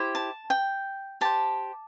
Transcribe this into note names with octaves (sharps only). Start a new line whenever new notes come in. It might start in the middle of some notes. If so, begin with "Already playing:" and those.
Already playing: E4 G4 C5
A5
G5
G4 C5 A5